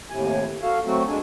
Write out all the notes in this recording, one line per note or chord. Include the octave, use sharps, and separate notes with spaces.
D#2 A2 C3 G#5
F#4 A4 F5
F#3 A3 C4 F#4
F2 G#3 D4 G#5